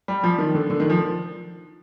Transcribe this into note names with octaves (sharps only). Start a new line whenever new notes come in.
G3
F3
D#3
D3
D3
D#3
F3